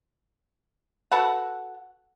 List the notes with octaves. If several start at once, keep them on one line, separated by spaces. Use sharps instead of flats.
F#4 A4 B4 F#5